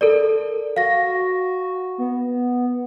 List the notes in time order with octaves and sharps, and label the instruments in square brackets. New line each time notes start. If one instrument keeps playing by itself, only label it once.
[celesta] A4 A#4 D5
[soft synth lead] F#4 [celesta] F5 A#6
[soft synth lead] B3